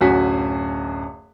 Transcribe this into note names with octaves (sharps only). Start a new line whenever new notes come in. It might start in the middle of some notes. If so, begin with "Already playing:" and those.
D1 F#2 F#4 G#5 B6